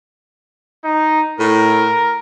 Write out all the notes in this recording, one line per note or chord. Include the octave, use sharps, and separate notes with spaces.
D#4
A2 A#4